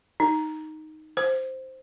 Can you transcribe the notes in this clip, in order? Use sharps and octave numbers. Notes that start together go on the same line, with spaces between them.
D#4
C5